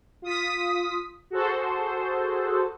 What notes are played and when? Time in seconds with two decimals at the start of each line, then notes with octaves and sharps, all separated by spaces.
0.22 F4 D#6 B6
1.31 F#4 G#4 A4 C5